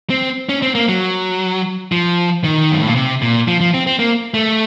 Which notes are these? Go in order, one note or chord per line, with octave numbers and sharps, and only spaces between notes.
C4
C#4
C4
A#3
F#3
F3
D#3
F#2
A2
A#2
C3
A#2
F3
F3
C4
C4
A#3
A3